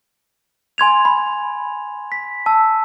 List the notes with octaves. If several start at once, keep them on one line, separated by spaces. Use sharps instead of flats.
G#5 C6 G#6 F7
B5
B6
A5 E6